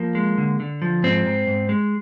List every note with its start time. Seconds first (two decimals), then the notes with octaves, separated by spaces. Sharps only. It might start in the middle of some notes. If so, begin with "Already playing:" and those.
Already playing: F3 A#3
0.15 G#3
0.38 D3
0.60 D3
0.82 F3
1.03 G#2 C4
1.26 G#2
1.47 G#2
1.69 G#3